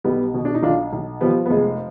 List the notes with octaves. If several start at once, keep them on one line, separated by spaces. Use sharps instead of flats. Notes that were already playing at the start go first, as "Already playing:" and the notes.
B1 G3 B3
B2
D4
D#4
B1 D4 F4
B1
F3 G3 B3
B3
F1 G#3